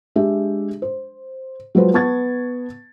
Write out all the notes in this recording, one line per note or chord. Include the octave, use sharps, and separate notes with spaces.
G#3 D4 G4 E5
C5
F#3 G#3 F4 B4 C5
B3 A5 C#6 G#6 A6